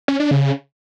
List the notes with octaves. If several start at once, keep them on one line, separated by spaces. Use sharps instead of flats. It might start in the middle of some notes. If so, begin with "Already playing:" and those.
C#4
D4
C#3